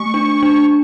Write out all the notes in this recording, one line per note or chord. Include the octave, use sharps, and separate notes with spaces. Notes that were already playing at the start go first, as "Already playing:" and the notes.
Already playing: A3 C#6
D4
D4